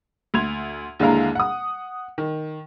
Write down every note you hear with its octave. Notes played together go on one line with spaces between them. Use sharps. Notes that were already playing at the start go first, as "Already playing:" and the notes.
D2 C6 G#6 F7
D#2 D3 G#3 E4 F5 A#5
F#5 D#6
D#3